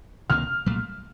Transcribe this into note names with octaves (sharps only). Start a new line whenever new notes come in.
C#2 C3 D#3 A#3 F6
C2 A#2 F#3 A3